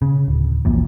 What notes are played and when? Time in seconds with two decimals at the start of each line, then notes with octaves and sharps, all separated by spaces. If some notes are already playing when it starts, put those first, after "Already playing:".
0.02 C#3
0.28 D1
0.65 E1 A#1 E2 A#2